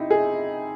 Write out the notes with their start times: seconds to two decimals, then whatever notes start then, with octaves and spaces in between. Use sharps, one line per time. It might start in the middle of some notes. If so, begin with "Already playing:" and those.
Already playing: C3 D#4 E4
0.11 G#4